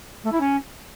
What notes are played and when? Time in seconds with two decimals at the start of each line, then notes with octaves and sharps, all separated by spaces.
0.23 A3
0.32 E4
0.40 C#4